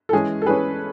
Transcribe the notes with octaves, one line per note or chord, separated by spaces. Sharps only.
A4
E3 G#3 C#4 G#4
A4
E3 G#3 C#4 G#4 B4